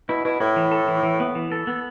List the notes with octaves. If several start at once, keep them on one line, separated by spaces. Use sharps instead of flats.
B2 E4
B2 E4
A2 E4
E3
A4
E3
E3
B3
E3
A4
B3